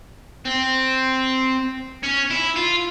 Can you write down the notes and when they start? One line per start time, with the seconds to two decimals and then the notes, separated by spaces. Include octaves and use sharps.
0.45 C4
2.03 C#4
2.30 E4
2.56 F4